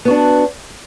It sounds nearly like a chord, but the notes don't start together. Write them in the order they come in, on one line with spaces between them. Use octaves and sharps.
B3 F#4 D4